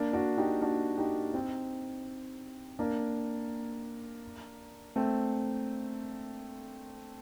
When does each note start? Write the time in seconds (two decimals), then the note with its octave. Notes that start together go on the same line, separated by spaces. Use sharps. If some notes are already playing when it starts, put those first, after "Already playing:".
Already playing: A#3 D4
0.13 D4 F#4
0.37 D#4 G4
0.62 D4 F#4
0.98 D#4 G4
1.34 C4 D#4
2.79 A#3 D4
4.96 A3 C4